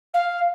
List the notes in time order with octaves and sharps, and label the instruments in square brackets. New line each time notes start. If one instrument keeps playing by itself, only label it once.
[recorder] F5